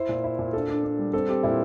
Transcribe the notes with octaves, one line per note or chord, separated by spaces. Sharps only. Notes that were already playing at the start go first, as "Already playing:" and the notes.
Already playing: E4 C5
A#2
E4
A#2
D4 A4
D4
D4
G3
C4 A4
C4 G4
A#2 E4